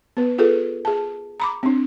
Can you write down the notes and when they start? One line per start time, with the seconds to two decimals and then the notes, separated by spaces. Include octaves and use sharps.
0.17 B3 B4
0.38 F4 G#4 A4 B4
0.85 G#4 A5
1.40 A#5 B5 D6
1.63 C4 D4